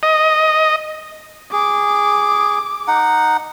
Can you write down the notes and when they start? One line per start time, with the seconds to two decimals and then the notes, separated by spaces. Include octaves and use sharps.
0.03 D#5
1.53 G#4 D6
2.88 D#4 F#5